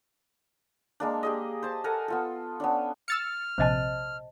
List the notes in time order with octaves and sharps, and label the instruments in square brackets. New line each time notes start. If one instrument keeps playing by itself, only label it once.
[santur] G#3 A#3 D4
G4 G#4 D#5
C5 A5
A4 A#4 F#5 G#5
B3 F4 A4
B3 C#4 D4
[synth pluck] E6 A6 C#7 [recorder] F6
[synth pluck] A#1 C3 [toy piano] C5 D#5 A5